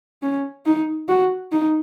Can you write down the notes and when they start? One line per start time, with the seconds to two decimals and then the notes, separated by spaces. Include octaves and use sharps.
0.22 C#4
0.66 D#4
1.08 F#4
1.52 D#4